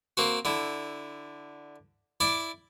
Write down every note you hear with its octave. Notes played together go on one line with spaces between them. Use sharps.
A#3 C4 F#4
D3 E4
E4 D5 D6